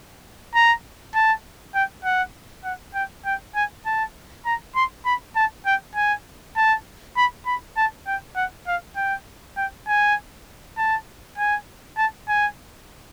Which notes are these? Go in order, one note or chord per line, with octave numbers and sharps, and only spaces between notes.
A#5
A5
G5
F#5
F#5
G5
G5
G#5
A5
A#5
C6
B5
A5
G5
G#5
A5
B5
B5
A5
G5
F#5
F5
G5
G5
G#5
A5
G#5
A5
G#5